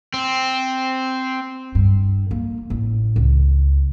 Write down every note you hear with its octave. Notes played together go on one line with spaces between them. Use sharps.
C4
G2
A#3
A1
C#2